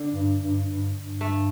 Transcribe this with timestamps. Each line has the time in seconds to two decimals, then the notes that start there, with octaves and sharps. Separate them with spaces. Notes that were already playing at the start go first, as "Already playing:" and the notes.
Already playing: D3
0.14 G2
0.40 G2
0.67 G2
0.93 G2
1.21 A3